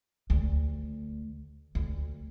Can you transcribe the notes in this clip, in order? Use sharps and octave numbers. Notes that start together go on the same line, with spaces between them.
D2
D2